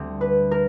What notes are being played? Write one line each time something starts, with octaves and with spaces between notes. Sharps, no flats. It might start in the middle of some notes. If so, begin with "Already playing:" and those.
Already playing: D2 D3 G3 C4
B4
A#4